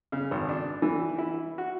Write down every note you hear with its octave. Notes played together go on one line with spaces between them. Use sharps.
C#3
G#1
D4
E3
E4
F#4